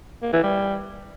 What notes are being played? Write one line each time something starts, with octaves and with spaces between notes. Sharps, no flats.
A#3
E3
G3